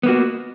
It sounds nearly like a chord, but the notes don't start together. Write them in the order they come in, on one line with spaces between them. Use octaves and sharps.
B3 A#3 F#4